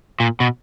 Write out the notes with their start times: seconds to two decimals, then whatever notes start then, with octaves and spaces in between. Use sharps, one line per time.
0.20 A#2
0.40 B2